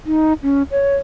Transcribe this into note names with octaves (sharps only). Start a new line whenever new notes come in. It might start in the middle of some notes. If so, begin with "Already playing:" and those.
D#4
C#4
C#5